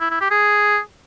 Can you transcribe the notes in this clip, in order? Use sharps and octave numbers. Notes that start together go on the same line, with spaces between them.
E4
E4
G4
G#4